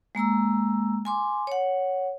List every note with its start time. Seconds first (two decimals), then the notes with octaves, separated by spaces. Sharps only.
0.15 G#3 A#3 A#5 E6
1.05 G#5 C6 D6
1.47 C#5 F#5